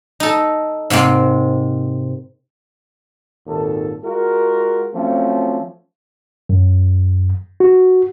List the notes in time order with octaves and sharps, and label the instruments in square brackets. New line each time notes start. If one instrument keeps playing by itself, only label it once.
[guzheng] D#4 A4
G#2 C3 A#3 C4
[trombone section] G#1 D#2 A#2 A4
G#3 F4 F#4 A#4
F3 F#3 A3 C4 C#4
[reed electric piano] F#2
F#4